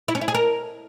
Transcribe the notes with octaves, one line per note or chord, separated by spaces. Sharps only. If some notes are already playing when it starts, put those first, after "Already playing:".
E4
C#4
E4
G#4
A#4